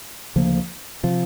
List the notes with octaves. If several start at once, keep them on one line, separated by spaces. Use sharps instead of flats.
D2 C#3 F3 A#3
C3 F3